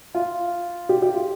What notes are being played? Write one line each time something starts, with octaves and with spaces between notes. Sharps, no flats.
F4
G4
G4
F4